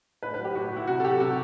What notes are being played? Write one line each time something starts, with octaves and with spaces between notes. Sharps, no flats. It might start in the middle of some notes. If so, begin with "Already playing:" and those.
A2 B4
B4
F#3
G4
A2 F#4
F#3
E4
C3 F#4
A4
F#3 G4
C3 F#4